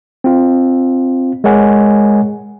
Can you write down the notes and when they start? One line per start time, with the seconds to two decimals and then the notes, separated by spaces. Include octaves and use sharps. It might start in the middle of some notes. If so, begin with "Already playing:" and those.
0.24 C4 F4
1.44 G#3 A#4 C#5 F#5 G#5